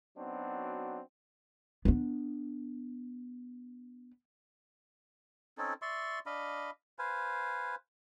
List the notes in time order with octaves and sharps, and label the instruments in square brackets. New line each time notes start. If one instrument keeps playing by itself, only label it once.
[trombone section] F#3 B3 C4 D4 D#4 F#4
[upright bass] B3 D4
[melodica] C4 C#4 D#4 A4
D5 E5 C6 C#6
D4 D#5 F5 B5
B4 C5 F5 G#5